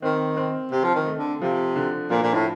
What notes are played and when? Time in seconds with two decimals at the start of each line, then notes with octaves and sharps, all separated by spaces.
0.02 D#3 C4
0.37 C4
0.72 C3 C4
0.84 F3
0.95 D#3
1.06 A3
1.18 D3
1.41 C3 F3
1.76 D3
2.10 A#2 F3
2.22 A#2
2.34 A2